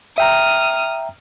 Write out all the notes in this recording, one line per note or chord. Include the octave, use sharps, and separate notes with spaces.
E5 G5 A#5 D#6 F6